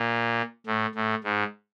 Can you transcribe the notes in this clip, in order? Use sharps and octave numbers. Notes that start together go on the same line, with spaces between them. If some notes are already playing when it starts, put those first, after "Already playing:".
Already playing: A#2
A2
A2
G#2